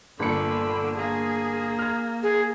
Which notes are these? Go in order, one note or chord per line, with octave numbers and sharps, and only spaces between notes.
G1 A#2 D3 B5 C#7
A#3 G#4
F6 G#6
G#4